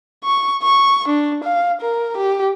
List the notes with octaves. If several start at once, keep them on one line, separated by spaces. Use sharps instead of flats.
C#6
C#6
D4
F5
A#4
G4